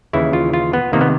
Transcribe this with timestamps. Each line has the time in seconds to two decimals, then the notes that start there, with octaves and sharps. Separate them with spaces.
0.13 D#2 C#3 E3 E4
0.33 F4
0.53 F4
0.73 B3
0.93 C3 D#3 A#3
1.01 B3